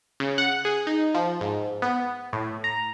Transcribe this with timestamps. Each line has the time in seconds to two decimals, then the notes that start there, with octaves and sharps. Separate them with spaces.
0.20 C#3
0.38 F#5
0.65 G#4
0.87 D#4
1.14 F3
1.41 G#2
1.82 B3
2.33 A2
2.64 A#5